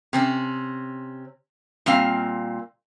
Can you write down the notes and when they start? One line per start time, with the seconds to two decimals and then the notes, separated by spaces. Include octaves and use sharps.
0.13 C3 C4 C#4
1.86 A#2 G3 C4 F5